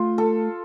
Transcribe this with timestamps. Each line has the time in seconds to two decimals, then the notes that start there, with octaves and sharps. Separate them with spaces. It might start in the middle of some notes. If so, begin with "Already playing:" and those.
Already playing: A3 F4
0.18 A4